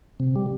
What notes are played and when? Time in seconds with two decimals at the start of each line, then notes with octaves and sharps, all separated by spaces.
0.20 C3
0.36 G3